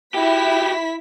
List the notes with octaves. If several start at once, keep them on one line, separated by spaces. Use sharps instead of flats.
E4 F#4 G4 B6